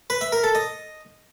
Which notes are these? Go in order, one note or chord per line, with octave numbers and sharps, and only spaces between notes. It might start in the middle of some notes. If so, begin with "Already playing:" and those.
B4
E5
A#4
A4
D#5